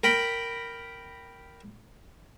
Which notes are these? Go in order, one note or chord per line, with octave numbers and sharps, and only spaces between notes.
A#4 G5 B5